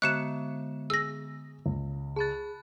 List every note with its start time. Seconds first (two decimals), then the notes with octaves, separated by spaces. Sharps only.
0.02 D3 G#3 B3 F#6 C#7 E7
0.90 G#4 E6 A#6
1.66 C#2
2.16 G#4 A5 B5 F#6 A6